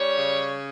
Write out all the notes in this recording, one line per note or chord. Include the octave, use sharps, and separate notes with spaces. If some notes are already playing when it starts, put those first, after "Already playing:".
Already playing: G3 C#4 C#5
C#3